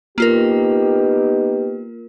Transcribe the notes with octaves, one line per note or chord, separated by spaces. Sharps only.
A#3 B3 D#4 F4 G4 A#4